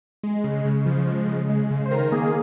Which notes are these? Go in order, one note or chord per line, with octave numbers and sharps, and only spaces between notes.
G#3
C#3
C#3
F3
G#3
C#3
G#3
C#3
C5
D#3 A#4
A#3 G#4